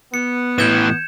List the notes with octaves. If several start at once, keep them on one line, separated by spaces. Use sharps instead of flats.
B3 C#7
A2 E3 G6 G#6 E7